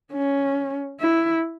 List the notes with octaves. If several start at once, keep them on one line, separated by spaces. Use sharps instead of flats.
C#4
E4